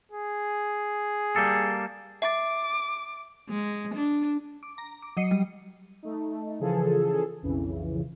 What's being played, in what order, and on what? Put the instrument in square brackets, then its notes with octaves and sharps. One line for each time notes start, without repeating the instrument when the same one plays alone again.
[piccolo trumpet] G#4
[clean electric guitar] G3 A#3 A4
[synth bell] E5 A6 [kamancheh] D6
[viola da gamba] G#3
D4
[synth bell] D6
A#5
D6
F#3 D#5 C7 C#7
G3
[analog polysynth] A3 D#4
C#3 E3 F3 G#4 A4
B1 F2 C#3 E3